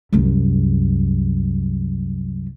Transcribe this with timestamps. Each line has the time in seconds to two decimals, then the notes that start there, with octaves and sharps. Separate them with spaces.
0.13 C2 F#2